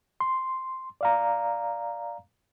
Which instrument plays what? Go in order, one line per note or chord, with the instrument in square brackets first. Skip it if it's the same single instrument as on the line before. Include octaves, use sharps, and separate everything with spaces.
[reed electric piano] C6
D5 F5 A#5